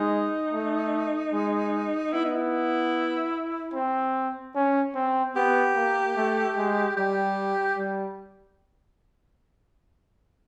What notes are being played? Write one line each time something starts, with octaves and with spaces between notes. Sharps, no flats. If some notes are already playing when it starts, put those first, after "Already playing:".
Already playing: G#3 D#4
A3
G#3
B3 E4
D#4
E4
C4
C#4
C4
B3 G4
A#3
A3
G#3
G3 G4
G3